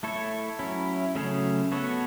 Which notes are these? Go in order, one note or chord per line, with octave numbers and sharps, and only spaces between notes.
A3 E4 A4 C#5
F#3 C#4 E4
C#3 F#3 A3 C#4 G#4
B3 F#4 A4 C#5